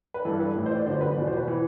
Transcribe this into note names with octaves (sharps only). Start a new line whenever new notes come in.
B4
G2 E3 A4
B4
A2 E3
C5
D5
F#2 D3 C5
B4
E2 B2 D5
C5
B4
E3